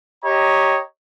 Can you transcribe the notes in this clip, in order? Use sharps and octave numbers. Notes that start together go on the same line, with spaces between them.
G4 C#5 D#5 A#5